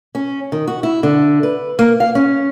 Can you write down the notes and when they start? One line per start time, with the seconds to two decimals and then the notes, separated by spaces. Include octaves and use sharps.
0.15 C#4
0.52 D#3
0.68 F#4
0.83 E4
1.03 D3
1.43 B4
1.79 A#3
2.00 F5
2.15 C#4